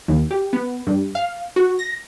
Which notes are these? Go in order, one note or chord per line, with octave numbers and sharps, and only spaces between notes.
D#2
G4
B3
G2
F5
F#4
A#6